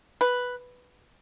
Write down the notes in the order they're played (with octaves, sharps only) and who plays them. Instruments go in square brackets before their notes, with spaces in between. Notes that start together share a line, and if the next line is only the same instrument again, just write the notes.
[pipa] B4